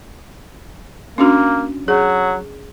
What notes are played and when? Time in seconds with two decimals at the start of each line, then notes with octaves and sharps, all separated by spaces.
1.18 A#3 C#4 D4 F#4
1.88 F#3 G#4